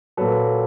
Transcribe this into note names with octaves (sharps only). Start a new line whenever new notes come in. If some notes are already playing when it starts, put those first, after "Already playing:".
A#2 F#3 A4 B4